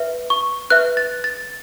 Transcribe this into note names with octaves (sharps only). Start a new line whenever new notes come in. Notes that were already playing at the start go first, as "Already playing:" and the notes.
Already playing: B4 E5
C#6
B4 E5 F#6
A6
A6